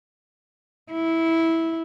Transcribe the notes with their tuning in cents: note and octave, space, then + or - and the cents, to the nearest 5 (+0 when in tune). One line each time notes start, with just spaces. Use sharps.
E4 -10